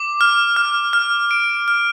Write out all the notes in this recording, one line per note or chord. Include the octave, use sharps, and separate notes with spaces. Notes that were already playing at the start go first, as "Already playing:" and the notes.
Already playing: D6
F6
F6
F6
D7
F6